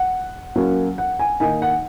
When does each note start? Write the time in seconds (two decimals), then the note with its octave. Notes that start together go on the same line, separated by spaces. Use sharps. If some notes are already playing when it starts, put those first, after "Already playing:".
Already playing: F#5
0.56 F#3 A#3 C#4
0.98 F#5
1.19 G#5
1.40 D#3 A#3 D#4 G#5
1.62 F#5